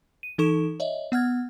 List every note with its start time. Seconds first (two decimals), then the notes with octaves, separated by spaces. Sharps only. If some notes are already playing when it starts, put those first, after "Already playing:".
0.23 D#7
0.38 E3 D#4 A4 C#6 E7
0.80 C#5 D#5 E5
1.12 B3 F#5 F6 G#6